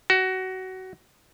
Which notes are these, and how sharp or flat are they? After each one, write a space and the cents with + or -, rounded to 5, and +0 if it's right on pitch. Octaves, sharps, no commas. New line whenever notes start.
F#4 +20